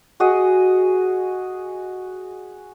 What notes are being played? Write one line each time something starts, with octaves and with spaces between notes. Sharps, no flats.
F#4 G#4 D#5